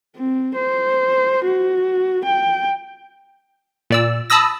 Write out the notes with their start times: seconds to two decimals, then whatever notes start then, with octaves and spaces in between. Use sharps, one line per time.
0.17 C4
0.55 C5
1.45 F#4
2.25 G5
3.90 A#2 D5 E6
4.30 A5 B5 D#6 E6 A#6